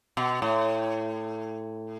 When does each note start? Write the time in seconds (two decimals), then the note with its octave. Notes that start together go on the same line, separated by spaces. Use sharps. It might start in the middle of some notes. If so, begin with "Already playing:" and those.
0.17 B2
0.42 A2